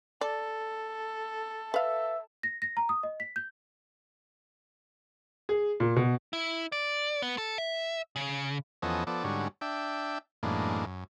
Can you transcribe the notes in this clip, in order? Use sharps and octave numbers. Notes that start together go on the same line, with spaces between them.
A4 D5
B4 E5 F5
A#6
A#6
A#5
D#6
D#5
B6
G6
G#4
A#2
B2
E4
D5
B3
A4
E5
C#3
E2 F3 B3 C#4 A4 D#5
F3 B3 A4 D5
G#2 D3 G3 C#4 F#4
D4 E5 G5
F#2 A2 E3 G#3 A#3 D4
F#2